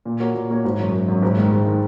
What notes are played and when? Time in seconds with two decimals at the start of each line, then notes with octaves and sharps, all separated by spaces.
0.05 A#2
0.20 A#3 F#4 A#4 C#5
0.35 A#2
0.50 A#3 F#4 A#4 C#5
0.65 G#1
0.79 F#2 F#3
0.93 G#1
1.08 F#2 F#3
1.22 G#1
1.37 G#2 D#3
1.52 G#1
1.66 D#3